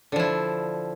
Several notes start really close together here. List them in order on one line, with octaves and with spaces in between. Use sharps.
D3 F3 E4